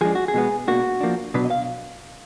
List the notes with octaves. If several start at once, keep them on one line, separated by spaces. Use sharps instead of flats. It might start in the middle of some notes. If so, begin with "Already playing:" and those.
F3 G#3 D4 G#4
F#4
G#4
B2 G#3 B3
B2 A#3 D4 F#4
F3 A#3 D4
B2 F#3 D4 B4
D#5
F5